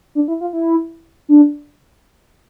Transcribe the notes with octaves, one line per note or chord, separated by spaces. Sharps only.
D4
E4
F4
E4
D4